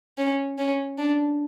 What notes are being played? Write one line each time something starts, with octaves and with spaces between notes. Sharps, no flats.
C#4
C#4
D4